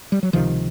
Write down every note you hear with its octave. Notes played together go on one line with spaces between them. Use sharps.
G3
F#3
C#2 C3 D#3 F3